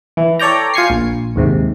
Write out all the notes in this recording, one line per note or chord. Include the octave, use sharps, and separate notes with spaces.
E3
A4 C#5 D5 G5 A#5
F4 G#5 C#6 C7
A#1
D#2 G#2 C3